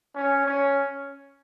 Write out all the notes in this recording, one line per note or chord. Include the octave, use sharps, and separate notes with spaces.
C#4
C#4